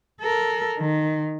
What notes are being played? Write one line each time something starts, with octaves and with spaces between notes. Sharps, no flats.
A4 A#4
D#3